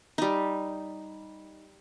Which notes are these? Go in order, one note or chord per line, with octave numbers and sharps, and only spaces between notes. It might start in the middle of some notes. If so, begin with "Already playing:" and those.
G3 D#4